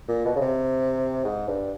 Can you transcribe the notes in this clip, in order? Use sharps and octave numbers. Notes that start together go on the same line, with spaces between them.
A#2
B2
C#3
C3
G#2
G2